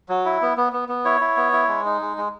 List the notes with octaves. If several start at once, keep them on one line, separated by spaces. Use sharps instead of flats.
F#3
E4
B3
B3
B3
B3
E4 C#5
E4
B3
E4
G#3
D#4
G#3
G#3